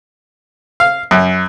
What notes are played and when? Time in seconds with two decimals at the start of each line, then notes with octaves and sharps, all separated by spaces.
0.80 F5
1.11 F#2